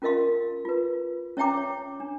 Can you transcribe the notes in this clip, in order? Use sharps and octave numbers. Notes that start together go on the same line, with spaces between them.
C#4 F4 A#4 D#5 F5 C6
F4 B4
C#4 C#5 E5 G5 A#5 D6
C#5
D4